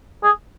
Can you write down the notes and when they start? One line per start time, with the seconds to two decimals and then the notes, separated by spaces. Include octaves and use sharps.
0.24 G#4